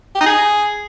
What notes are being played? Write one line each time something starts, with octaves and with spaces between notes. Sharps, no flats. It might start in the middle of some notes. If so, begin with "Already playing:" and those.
G4
D#4
G#4